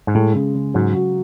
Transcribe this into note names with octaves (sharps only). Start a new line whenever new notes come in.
G#2
A2 G#3
C#3
C#3
G#2 F#3
F#4